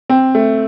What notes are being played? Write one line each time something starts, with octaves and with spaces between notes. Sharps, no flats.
C4
A3